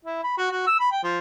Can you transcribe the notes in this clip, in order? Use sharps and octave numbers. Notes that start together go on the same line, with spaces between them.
E4
B5
F#4
F#4
E6
B5
G5
F3